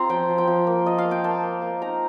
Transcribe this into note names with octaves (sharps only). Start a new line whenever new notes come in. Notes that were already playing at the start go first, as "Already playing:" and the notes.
Already playing: C4 F4 A#5 C6
F3 G5
F3
G5
F3
A#3
F4 D#5
F5
A#3
G5
A#3 A5
A#3
A#3
D#4 A#5